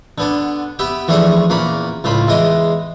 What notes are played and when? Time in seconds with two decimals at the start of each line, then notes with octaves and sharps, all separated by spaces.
0.18 D3 B3 D4
0.79 B3 G4 E5 G5
1.08 E3 F3 A3 C#4 D4 G#4
1.50 E2 A#2 A#3 C#4 B5
2.04 C#2 A2 F4 C5 B5
2.28 E2 E3 G#3 D#5 G5